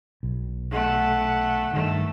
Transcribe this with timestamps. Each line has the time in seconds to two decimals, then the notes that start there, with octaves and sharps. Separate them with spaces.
0.23 B1
0.72 A3 F#5
1.73 G2 D#3 A3